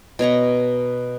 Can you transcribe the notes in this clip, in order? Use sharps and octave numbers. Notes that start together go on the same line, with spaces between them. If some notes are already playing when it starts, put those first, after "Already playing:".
B2 C#5 A#5 C#6